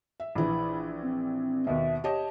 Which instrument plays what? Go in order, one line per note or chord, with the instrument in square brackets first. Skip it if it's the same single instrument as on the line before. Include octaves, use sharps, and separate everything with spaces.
[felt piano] E5
[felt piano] A#1 E3 [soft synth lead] B5
[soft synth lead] C4
[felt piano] D#2 B2 [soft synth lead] E5
[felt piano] G4 C#5 D#5 [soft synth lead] A5